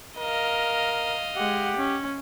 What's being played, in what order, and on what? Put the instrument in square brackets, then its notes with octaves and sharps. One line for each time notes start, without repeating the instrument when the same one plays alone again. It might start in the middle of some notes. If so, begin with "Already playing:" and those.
[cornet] A#4 [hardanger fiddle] D#5 F5
[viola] G#3 F#5 [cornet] G4
[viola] C#4